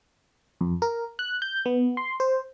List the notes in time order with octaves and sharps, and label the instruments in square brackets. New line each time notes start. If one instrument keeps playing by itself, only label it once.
[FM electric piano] F2
A#4
F#6
G6
B3
C6
C5